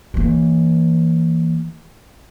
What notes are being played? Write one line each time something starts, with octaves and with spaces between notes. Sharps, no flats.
E3 A#3